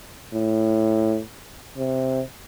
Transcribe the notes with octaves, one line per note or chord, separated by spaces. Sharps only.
A2
C3